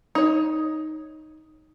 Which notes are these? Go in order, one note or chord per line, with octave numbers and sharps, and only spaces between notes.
D#4 C#5